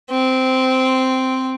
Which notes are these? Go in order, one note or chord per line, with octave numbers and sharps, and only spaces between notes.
C4